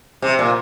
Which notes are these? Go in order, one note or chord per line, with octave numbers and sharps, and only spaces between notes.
C3
A#2